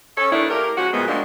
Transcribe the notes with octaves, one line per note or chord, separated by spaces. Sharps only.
C#4 A4 C#5
D#3 A3 B3 D4 E4
A3 A#3 G4 A#4
F3 G#3 C#4 F#4
F2 A#2 F#3 G#3 A3 B3
F3 F#3 G#3 A#3 C4 D4